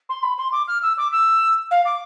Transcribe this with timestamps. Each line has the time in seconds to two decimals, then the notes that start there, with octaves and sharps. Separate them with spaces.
0.09 C6
0.22 B5
0.38 C6
0.52 D6
0.67 F6
0.82 E6
0.97 D6
1.11 E6
1.70 F5
1.85 D6